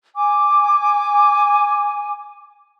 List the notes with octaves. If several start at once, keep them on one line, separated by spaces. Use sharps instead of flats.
G#5 D6